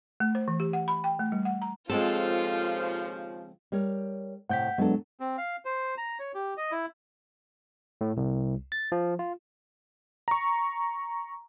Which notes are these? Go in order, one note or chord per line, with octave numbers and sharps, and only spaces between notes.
A3
C5
E3
G4
F#5
B5
G5
A3
G3
F#5
A#5
D#2 C#3 F3 G#3 C4 F4 A4
G3 A#4 C#5
A2 C3 F#5 G6 B6
F#3 G#3 B3 D4 A4
C4
F5
C5
A#5
C#5
G4
D#5
E4
A2
C2
A6
F3
F4
A#5 C#6